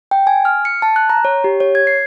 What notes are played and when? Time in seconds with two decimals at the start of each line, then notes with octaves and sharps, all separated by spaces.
0.11 G5
0.27 G#5
0.45 F6
0.65 C#7
0.82 A5
0.96 F#6
1.09 A#5
1.25 C#5
1.44 G4
1.60 C#5
1.75 G#6
1.87 C7